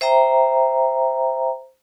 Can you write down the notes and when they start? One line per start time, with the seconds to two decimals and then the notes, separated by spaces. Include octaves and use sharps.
0.01 C5 E5 G5 A#5